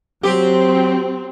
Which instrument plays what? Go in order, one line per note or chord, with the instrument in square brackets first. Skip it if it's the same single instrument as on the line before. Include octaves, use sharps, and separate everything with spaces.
[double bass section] F#3 [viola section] C4 [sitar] G4